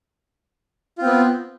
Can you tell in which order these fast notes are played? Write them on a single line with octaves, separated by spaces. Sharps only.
F4 C4 B3